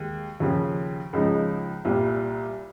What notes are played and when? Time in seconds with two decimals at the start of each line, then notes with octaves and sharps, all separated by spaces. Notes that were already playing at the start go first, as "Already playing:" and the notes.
Already playing: D#2 G#3
0.40 D#2 C#3 F3
1.13 C#2 C#3 F3 G#3 D#4
1.85 C2 A#2 G3